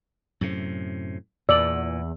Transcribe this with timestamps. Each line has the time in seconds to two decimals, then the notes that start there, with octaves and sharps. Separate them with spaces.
0.41 F#2 A2 C3
1.49 E2 A#2 D5 E6 F#7